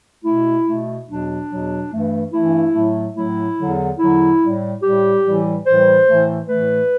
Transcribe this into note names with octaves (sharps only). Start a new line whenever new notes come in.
B2 A3 E4
B2 A3
E2 B2 F#3 D4
E2 B2 F#3
G2 E3 A3
G2 E3 A3 E4
A2 F#3 A3
A2 F#3 A3 E4
E2 D3 F#3
E2 D3 F#3 E4
A2 G3
A2 G3 G4
A2 E3 G3
A2 E3 G3 C5
A2 E3 A3
A2 E3 A3 B4